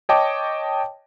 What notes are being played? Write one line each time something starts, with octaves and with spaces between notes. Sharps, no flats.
C#5 D#5 G5 A5 D6